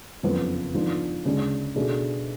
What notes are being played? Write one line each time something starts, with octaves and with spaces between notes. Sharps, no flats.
F#1 F2 C#3 F3 B3
G#2 F3 B3 D4 F4
D2 C#3 G#3 D4
B2 A3 D4 G#4